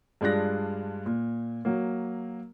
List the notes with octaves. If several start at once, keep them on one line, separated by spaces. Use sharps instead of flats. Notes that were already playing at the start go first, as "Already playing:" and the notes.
G2 G#3 D4 F4 F#6 A#6
A#2
F#3 A#3